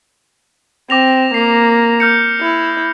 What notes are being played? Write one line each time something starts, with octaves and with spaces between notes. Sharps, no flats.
C4 D6 A#6 F7
A#3 C7
F6 G6 C#7
E4